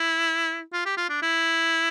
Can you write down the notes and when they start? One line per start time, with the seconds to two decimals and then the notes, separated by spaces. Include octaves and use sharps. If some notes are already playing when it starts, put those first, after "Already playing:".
Already playing: E4
0.72 F4
0.85 G4
0.97 F4
1.09 D4
1.22 E4